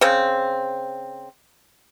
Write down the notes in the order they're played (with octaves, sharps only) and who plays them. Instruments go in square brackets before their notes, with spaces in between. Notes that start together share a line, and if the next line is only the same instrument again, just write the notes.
[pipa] C#3 C4